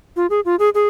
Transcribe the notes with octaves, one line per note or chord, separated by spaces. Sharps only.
F4
G#4
F4
G#4
G#4